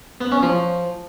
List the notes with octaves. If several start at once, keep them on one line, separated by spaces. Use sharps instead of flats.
B3
C#4
F3